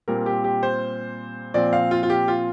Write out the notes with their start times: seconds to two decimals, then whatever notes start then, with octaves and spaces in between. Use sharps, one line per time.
0.08 A#2 G3 C4 A#4
0.26 G4
0.44 G4
0.63 C5
1.54 A#2 F3 C4 D5
1.73 F5
1.91 F4
2.03 F4
2.10 G4
2.28 F4